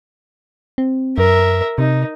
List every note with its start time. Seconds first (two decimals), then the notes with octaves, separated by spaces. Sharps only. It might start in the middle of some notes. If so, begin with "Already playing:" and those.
0.78 C4
1.18 F#2 A#4 E5
1.78 C3 D#4